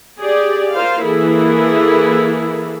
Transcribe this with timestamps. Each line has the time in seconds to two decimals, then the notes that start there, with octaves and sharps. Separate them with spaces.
0.19 G4 G#4 D5
0.73 F4 A#4 C5 F5
1.04 E3 A#3 E4 G#4 A4